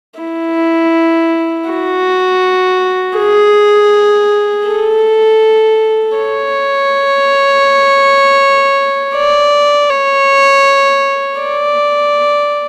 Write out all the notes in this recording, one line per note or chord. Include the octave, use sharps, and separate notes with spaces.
E4
F#4
G#4
A4
C#5
D5
C#5
D5